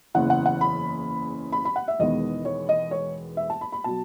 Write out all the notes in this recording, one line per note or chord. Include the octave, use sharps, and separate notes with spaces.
F#1 E2 C#3 E3 F#5
F#5
F#5
B5
B5
B5
F#5
E5
E1 E2 D#3 G#3 B3 D#5
C#5
D#5
C#5
E5
A5
B5
B5
B2 F#3 A5